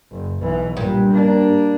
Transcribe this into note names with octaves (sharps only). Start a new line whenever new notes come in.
F#1
B1 E3
G2 A#2
A#3 D4